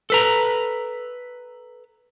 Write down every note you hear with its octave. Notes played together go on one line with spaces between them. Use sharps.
A4 B4 A#5